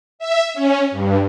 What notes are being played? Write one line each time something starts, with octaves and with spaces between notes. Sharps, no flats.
E5
C#4
G2